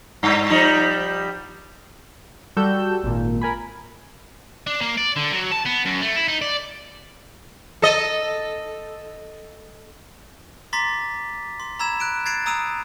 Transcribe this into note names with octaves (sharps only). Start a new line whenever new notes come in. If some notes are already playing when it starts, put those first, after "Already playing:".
G2
F3 G3 D#4
G3 F#4 A4 E6 G6
G#1 A#2
A#4 G#5 B5
D4
A#3
D5
D3
F#3
A5
B3
F#2
A3
E4
D#4
D5
A4 D#5
A#5 C6 D6 A6 B6
C6
A#5 B5 E6 G#6 E7
F#6 D7 E7
G#6 A6 C7 D7 F7
A#5 D#6 E6 D7 D#7 F7